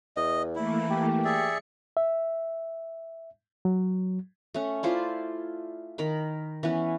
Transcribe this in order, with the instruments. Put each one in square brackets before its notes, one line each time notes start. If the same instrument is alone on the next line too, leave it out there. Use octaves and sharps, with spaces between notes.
[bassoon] E2 [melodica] D#5
[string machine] E3 A3 A#3 [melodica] E4
[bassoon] G4
[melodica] G#4 D5 E5 [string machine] C#7
[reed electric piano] E5
F#3
[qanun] A3 C#4
E4 F4 C5 D5
D#3 A#4 B5
E3 B3 C#4